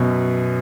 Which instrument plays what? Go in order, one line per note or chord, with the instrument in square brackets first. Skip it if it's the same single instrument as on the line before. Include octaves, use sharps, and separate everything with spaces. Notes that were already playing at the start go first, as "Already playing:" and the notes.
Already playing: [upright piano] F#2 B2